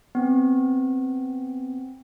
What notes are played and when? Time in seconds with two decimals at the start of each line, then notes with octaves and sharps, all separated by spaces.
0.15 B3 C4